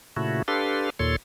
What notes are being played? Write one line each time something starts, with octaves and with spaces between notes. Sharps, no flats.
A#2 C#3 A3 E4 F#4
D4 G4 A4 B4 F5 C6
D#2 A#2 A4 C#5 C6